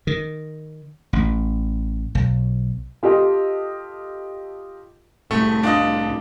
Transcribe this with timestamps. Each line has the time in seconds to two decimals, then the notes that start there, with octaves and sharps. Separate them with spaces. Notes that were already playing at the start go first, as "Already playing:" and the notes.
0.07 D#3
1.13 A1
2.15 B1
3.03 F4 G4 A4 D#5
5.31 C2 A2 A3
5.63 D4 F4 D#5